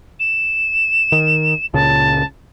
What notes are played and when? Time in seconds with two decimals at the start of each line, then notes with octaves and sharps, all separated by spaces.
0.20 E7
1.12 D#3
1.74 C#2 A#2 C#3 A5